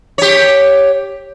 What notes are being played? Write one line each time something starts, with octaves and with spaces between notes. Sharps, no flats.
G4 C#5